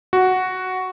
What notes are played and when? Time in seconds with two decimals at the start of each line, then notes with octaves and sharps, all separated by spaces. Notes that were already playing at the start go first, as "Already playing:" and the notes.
0.13 F#4